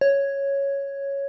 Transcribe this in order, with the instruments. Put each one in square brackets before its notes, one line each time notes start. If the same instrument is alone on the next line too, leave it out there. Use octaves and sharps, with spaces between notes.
[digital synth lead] C#5